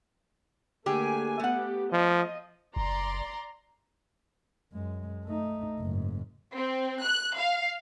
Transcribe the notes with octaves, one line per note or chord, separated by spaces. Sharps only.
D3 A3 A#3 G4 G#4 G#5
A3 B3 G4 F#5
F3 D#5
F#1 D5 A#5 C6
F#2 G#3
A3 D#4
F#1 G#2
C4
F#6
F5